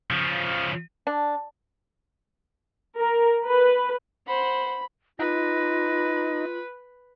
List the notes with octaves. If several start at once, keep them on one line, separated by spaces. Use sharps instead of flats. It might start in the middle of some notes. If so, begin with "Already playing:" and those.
C#3 F3
D4
A#4
B4
C5 F#5 B5
D#4 F4 B4 A#6